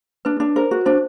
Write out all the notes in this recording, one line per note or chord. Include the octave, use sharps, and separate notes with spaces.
D4 B4
D4
A#4 C5
F#4
D4 C5